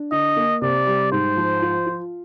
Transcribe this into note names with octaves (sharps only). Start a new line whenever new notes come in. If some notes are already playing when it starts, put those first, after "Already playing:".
Already playing: D4
D3 D#5
A#3
C3 D5
G3
G#2 C5
F3
F4
F4